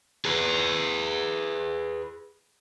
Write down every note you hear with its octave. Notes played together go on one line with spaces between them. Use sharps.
G#4 B4